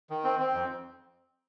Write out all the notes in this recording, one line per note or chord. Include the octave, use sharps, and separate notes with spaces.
D#3
C4
C4
F2